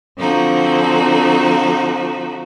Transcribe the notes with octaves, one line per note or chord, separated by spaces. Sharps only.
D3 F3 C4 D#4 F#4